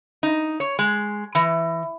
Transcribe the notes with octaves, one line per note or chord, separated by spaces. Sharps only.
D#4
C#5
G#3
E3